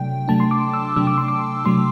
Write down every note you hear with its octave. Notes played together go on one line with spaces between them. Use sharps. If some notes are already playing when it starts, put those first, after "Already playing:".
Already playing: C3 F#3 A3 D4 G5
C3 F#3 A3 D4 A5
C6
D6
E6
C3 F#3 A3 D4 E6
D6
C6
D6
C3 F#3 A3 D4 C6